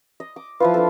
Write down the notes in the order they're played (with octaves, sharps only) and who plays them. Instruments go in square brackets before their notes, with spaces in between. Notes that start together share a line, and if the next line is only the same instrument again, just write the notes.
[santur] D#5
D6
[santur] F3 E4 F4 [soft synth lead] B4
[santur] D4 A4